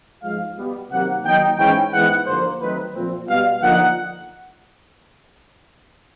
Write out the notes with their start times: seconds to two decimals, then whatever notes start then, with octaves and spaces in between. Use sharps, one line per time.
0.23 G#2 F3 G#3 F5
0.57 B2 G3 B3
0.91 C3 D#3 F#3 A#3 F#5
1.24 D#3 F#3 A#3 D#4 G5
1.58 G#2 E3 G#3 C#4 E4 G5
1.93 G#2 E3 G#3 B3 E4 F#5
2.27 G2 D3 F3 A#3 C5
2.60 D#3 F#3 A3 C4 D#4 B4
2.94 A#2 F3 A3 C4
3.28 B2 G3 B3 F5
3.62 D3 F3 A#3 D#4 F#5